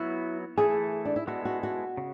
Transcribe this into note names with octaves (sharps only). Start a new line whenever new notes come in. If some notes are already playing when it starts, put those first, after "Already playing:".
Already playing: F#3 B3 E4 F#4
E3 A3 E4 G#4 A4
D4
E4
G#3 B3 E4 F#4 A4
F#4
F#4
C#3